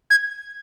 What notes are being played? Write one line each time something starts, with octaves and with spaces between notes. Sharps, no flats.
G#6